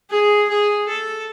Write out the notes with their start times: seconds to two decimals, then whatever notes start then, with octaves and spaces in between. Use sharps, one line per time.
0.10 G#4
0.49 G#4
0.88 A4